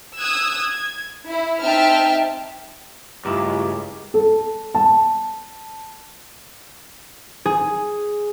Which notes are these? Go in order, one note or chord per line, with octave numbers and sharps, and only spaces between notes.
D#6 E6 F#6 G#6
G#6
E4
C4 D#4 E5 G5 A5 F6
C#2 G2 A3 E4 G4 A#5 D6
A4
A5
G#4